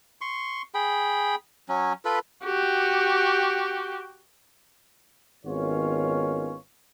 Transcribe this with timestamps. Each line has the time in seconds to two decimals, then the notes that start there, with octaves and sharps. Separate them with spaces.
0.21 C6 C#6
0.74 G#4 G5 B5
1.69 F#3 C#4
2.05 F4 A4 B4 B5
2.44 F#4 G4
5.45 G#1 D#3 B3 C#4 F4 C#5